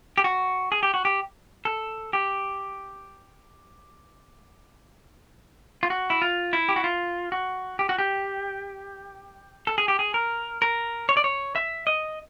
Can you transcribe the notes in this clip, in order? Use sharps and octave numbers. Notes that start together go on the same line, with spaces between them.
G4
F#4
G#4
G4
F#4
G4
A4
G4
F4
F#4
E4
F4
E4
G4
F#4
F4
F#4
G4
F#4
G4
A4
G#4
G4
G#4
A#4
A#4
C#5
D5
C#5
E5
D#5